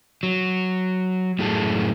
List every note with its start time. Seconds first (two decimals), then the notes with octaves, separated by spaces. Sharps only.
0.23 F#3
1.39 F#2 A2 F#3 G#4 A4 A5